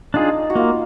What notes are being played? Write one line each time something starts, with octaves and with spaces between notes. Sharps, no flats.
D4 D#4 F4 G#4
F#4
A#3 F4